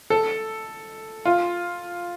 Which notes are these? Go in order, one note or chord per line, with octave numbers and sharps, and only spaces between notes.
A4
F4